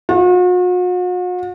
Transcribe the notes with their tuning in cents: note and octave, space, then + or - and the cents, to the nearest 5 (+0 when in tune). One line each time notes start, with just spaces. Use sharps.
F#4 -45